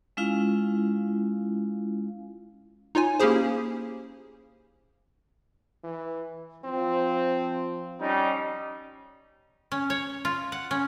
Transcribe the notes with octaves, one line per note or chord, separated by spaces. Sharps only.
G#3 C#4 E4 F4 F5
D#4 F4 C#5 G#5
A#3 C#4 E4 G4 G#4 C5
E3
F3 C4
G3 C#4 D#4
C#4
C#5
F4
F#5
C#4